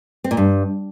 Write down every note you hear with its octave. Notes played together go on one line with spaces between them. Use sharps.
C4
A#2
G2